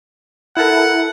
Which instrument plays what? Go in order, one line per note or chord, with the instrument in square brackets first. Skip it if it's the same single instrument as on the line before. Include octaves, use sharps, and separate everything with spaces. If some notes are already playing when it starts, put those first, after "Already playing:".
[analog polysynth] E4 A4 A#4 [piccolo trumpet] F#5